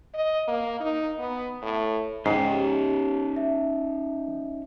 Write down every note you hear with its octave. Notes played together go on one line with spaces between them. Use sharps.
D#5
A#3
D#4
B3
A2
G#2 C#4 D#4 G5 A#5 C7
G4
E5